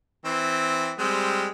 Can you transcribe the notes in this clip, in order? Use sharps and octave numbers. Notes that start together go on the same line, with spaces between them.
E3 C4
G3 G#3 C4